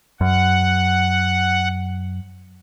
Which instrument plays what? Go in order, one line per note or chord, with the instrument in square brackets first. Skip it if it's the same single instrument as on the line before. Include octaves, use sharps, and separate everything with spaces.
[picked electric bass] F#2 [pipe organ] F#5